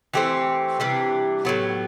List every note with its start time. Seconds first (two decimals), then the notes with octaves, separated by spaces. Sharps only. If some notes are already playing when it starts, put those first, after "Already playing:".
0.14 E3 A3 C4 E4 G4
0.80 C3 E3 G3 D4
1.45 A2 F#3 B3